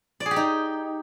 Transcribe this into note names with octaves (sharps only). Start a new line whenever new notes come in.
D5
G#4
G4
D#4